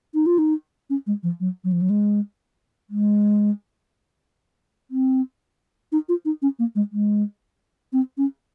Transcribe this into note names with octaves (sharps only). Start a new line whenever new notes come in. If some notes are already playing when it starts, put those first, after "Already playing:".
D#4
F4
D#4
C#4
G#3
F3
F#3
F#3
F3
F#3
G#3
G#3
C4
D#4
F4
D#4
C#4
A#3
G#3
G#3
C4
C#4